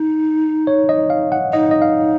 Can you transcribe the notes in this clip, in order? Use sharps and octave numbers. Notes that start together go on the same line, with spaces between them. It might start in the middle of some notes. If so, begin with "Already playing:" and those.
Already playing: D#4
C#5
D#5
F5
F#5
D#4 D#5
D#5
F5